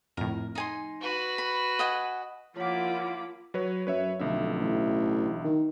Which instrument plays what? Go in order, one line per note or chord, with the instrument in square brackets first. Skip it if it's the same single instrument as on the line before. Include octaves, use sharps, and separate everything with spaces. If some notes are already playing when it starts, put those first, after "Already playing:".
[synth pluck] F2 A2 [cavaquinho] A#4
[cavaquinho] D#4 G#5 C6
[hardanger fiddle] F#4 B4
[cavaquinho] B5
D#5 F#5 G#5
[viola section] F3 A#3 E4 [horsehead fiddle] F4 [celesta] C#5 F#5 [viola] B5 D6
[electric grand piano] F#3 B4 C#5
[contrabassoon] F#2 [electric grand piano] B4 C#5 E5
[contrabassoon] F1 [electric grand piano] B1 D3 E5
[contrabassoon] A1
D#3